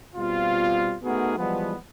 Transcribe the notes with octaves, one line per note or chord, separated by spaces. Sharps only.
B2 G3 C4 F4
A3 B3 D#4 F#4 G#4 A#4
E3 F3 G3 G#3 B3